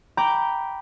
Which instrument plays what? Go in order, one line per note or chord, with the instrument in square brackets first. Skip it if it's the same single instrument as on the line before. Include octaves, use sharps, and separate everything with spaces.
[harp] G5 A#5 B5 D6 G6